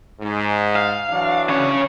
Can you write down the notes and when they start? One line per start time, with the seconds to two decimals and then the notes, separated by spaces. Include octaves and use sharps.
0.21 G#2
0.76 F5
1.10 E3 F#3 D4
1.49 C#3 C#5